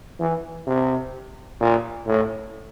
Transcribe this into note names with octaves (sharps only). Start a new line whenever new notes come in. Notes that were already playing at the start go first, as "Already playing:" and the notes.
E3
C3
A#2
A2